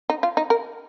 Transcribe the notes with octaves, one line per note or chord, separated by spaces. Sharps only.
D#4
F4
D#4
A#4